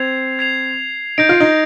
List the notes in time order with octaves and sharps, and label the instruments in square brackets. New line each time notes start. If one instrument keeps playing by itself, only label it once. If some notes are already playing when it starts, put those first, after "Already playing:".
Already playing: [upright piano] C4 [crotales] G#6 C7 F7
[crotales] G#6 C7 F7
[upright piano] D#4 [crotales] G6 A#6 D7
[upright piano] F4
D#4